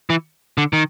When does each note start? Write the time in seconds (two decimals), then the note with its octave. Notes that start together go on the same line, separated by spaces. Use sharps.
0.10 E3
0.58 D3
0.73 D#3